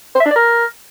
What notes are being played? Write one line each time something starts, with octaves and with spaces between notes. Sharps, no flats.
C5
E5
D4
D5
A#4